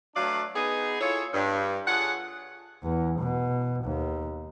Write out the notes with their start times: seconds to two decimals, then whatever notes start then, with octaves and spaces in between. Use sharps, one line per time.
0.16 F#3 A3 D4 B4 D5 F5
0.55 B3 D#4 G#4
1.00 E4 F4 G#4 A4 C#5
1.34 G2
1.87 F4 G#4 A4 C#5 F#5
2.83 E2
3.20 B2
3.84 D#2